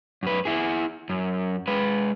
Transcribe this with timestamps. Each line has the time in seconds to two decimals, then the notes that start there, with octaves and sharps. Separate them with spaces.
0.23 F#2 B4
0.45 E4 G#4
1.10 F#2
1.68 G#3 B4